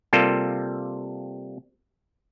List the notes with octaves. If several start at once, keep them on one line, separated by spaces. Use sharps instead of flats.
C3 G3 A#3 F4 A4